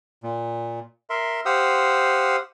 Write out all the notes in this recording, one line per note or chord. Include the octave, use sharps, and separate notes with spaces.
A#2
A#4 E5 C6
G4 C5 F5 F#5 D#6 E6